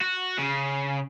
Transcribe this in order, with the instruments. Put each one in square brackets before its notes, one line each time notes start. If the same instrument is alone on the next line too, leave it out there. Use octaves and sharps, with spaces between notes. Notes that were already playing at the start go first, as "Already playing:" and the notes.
[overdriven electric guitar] F#4
C#3